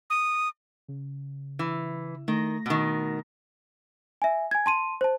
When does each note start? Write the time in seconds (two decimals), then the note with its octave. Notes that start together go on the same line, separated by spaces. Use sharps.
0.10 D#6
0.88 C#3
1.59 E3
2.28 D#3 A3 A#6
2.66 B2 D#3
4.22 E5 G#5
4.51 G#5 G#6
4.66 A5 C6 D#7
5.01 C5 A5